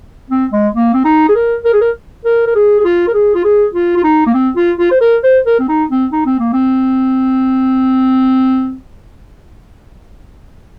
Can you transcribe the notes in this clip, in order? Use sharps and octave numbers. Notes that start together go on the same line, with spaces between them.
C4
G#3
A#3
C4
D#4
G#4
A#4
A#4
G#4
A#4
A#4
A#4
G#4
G#4
F4
A#4
G#4
F4
G#4
F4
F4
D#4
A#3
C4
F4
F4
C5
A#4
C5
A#4
C4
D#4
C4
D#4
C4
A#3
C4